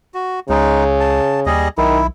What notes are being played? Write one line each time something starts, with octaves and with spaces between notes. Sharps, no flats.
F#4
C#2 C#3 G#3 D#4
A5
D#2 G3 G#4 D#5
B1 D#3 E4